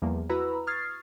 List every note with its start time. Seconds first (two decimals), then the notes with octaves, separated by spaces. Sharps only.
0.02 E2 F3 G3 A#3
0.29 E4 F#4 B4 A#5 B5 E6
0.67 C#6 D#6 F6 G#6 A6 C7